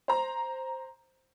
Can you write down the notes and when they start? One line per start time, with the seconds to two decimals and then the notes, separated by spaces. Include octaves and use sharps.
0.08 C5 A#5